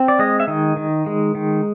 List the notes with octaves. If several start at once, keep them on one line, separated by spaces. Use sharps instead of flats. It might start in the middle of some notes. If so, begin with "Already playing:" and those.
Already playing: C4
D5
G#3 D#5
E5
D#3 D#5
D#3
G#3
D#3